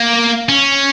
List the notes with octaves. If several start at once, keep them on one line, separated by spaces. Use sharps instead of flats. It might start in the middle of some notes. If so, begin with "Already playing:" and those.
Already playing: A#3
C#4